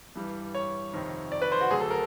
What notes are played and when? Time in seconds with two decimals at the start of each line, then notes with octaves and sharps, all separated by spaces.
0.16 G2 E3 G3
0.55 C#5
0.93 F2 C3 D#3
1.32 D5
1.42 B4
1.52 C5
1.61 F#4
1.71 D2 D3 F#3 G#4
1.80 A4
1.90 A#4